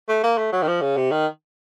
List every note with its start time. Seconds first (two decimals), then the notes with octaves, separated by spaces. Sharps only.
0.09 A3
0.24 A#3
0.38 A3
0.52 F#3
0.63 D#3
0.67 F3
0.82 C#3
0.97 C3
1.11 D#3